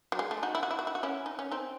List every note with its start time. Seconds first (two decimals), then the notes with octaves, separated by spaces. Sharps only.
0.12 F#3
0.19 G#3
0.31 A3
0.43 D#4 F#4
0.55 E4
0.63 F#4
0.71 E4
0.79 F#4
0.87 E4
0.95 F#4
1.03 C#4 E4
1.26 D#4
1.39 C#4
1.52 C4 D#4